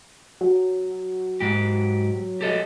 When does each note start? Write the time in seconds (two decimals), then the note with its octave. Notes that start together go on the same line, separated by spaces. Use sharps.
0.41 F#3
1.40 G#2 G4
2.41 G4 A4 D#5